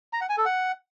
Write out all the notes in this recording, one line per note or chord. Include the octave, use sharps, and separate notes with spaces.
A#5
F#5
G#5
A4
F#5